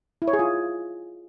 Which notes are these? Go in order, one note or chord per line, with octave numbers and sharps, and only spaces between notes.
E4
C#5
G#4
F4